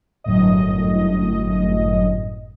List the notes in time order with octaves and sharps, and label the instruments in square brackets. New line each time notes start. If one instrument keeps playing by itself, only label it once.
[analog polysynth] G1 F#2 A2 D#5